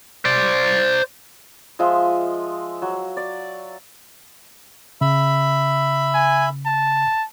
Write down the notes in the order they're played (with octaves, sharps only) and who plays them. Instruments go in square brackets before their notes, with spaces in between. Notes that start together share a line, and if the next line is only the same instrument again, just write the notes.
[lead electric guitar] C5 D5
[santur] F3 G#3 D#5 E5
F#3
D5
[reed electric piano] C#3 [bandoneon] E5 B5
[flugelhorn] G#5
A5